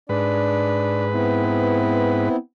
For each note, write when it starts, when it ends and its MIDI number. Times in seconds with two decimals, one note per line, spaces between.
0.09 2.29 44
0.09 1.05 62
0.09 2.29 71
0.09 1.05 74
1.13 2.36 59
1.13 2.36 60
1.13 2.36 64